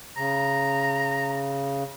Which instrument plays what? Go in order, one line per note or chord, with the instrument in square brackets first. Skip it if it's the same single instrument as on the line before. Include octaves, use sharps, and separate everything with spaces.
[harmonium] C#3 [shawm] A#5